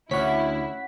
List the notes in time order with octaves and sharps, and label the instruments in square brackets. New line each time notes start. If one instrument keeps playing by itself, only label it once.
[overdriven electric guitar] D2 [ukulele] C#4 C#5 [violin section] E4 [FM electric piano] F#5 B6